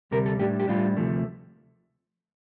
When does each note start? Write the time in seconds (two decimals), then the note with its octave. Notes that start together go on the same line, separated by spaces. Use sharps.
0.11 D2 C3 G3 A#4
0.26 A4
0.39 A2 G3 D4 G4
0.60 G4
0.68 A2 G3 D4 F4
0.97 D2 C3 F3 A3